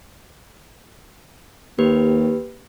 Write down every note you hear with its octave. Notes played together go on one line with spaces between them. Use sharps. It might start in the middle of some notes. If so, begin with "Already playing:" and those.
D#2 A#3 G4 B4